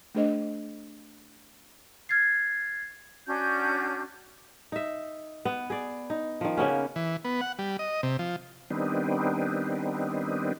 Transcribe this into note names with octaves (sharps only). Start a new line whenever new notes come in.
A3 D4 G#4 C5 D#5
F6 G#6 A6 C7
C#4 D4 F#4 G6
D#4 E5
B3
G#4 D5
D#4
D#3 F3
C#3 A#3 B3 C#4
E3
B3
F#5
G3
D#5
C3
F3
D#3 G3 B3 C4 D4 D#4